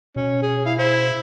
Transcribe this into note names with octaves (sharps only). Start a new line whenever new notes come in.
B2 C#4
G#4
E4 F5
E4 C5